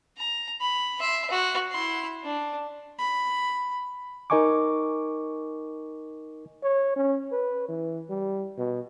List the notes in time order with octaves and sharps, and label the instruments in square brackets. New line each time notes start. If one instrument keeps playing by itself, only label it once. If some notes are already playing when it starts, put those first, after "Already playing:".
[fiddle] A#5
B5
E5 C6
F#4
E4 C6
D4
[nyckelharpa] B5
[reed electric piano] D#4 A#4 D#5 G#5 C#6 D6
[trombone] C#5
C#4
B4
E3
G3
B2